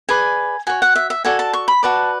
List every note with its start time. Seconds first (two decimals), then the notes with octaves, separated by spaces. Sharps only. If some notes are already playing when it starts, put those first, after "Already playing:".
0.09 G#4 B4 D5 G#5
0.67 F#4 C#5 G#5
0.82 F#5
0.95 E5
1.10 E5
1.25 F#4 A4 D5 G#5
1.39 A5
1.53 C#6
1.68 B5
1.83 F#4 B4 D5 A5